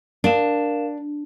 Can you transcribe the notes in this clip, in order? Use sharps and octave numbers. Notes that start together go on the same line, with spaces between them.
D4 A#4 F5 E7